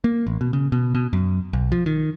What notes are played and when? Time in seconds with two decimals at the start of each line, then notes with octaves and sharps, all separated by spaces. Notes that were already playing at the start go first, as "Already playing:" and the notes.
0.04 A#3
0.27 A1
0.41 B2
0.53 C#3
0.72 B2
0.95 B2
1.13 F#2
1.53 B1
1.72 F3
1.86 D#3